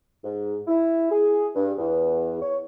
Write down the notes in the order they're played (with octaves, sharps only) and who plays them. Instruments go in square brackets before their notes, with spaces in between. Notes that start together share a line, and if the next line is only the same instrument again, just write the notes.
[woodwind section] G#2
E4
G#4
G2
E2
C#5